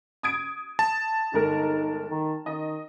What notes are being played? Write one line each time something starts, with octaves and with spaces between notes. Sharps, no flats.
D#6 G#6 D7
A5
G1 G#3 D#4 A#4
D#3
D#3 D#5